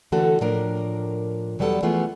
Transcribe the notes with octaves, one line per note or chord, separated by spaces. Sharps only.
D3 E3 A3 F#4 A4
A2 F3 A#3 D4 A#4
E2 F#3 G3 B3 E4 A4
E3 F3 A3 B3 F4 G#4